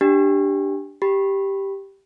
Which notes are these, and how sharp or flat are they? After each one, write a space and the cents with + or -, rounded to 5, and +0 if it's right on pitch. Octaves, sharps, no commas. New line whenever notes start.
D4 +0 G4 +0
G4 +0 B5 +0